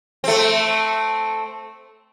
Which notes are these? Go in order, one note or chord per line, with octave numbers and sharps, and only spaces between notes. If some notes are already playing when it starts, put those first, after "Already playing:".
A3 C4